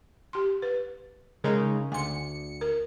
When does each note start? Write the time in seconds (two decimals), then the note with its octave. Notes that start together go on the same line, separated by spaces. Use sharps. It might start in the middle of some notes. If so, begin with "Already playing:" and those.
0.33 G4 C6
0.62 B4
1.44 C#3 G#3 D#4 A#4
1.92 D2 G#5 C6 C#7
2.61 A#4